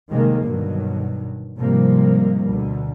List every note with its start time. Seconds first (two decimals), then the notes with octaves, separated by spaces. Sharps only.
0.11 A2 C3 D#3 G3 G#3 A#3
0.43 G2 B2 D3 D#3 F#3
1.58 G#2 C3 D#3 F3 G3 A#3
2.47 D2 B2 D3